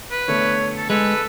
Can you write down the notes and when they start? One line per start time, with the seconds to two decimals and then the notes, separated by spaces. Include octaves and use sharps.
0.11 B4
0.28 D3 A3 B3 C#5
0.77 A4
0.90 G#3 A4 B4